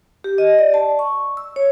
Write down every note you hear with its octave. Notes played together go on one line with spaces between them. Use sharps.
G4
D#5
D5
A5
C#6
E6
C#5